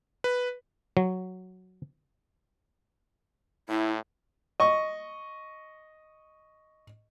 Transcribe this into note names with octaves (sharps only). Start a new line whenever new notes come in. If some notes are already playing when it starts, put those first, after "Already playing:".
B4
F#3
A2 E4
D#5 C#6